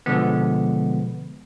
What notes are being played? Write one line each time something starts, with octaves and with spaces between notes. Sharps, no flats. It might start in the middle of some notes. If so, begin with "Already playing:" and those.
B2 D3 F3 G#3 B3